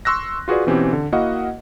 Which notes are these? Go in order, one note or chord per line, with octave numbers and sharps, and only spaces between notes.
C6 C#6 E6 F#6 A#6
F4 F#4 G#4 B4 D5
B2 E3 C4 C#4 G4
D3
A#3 E4 F#4 D#5 F5 F#5